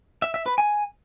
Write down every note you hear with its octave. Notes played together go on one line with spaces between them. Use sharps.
E5
E5
B4
G#5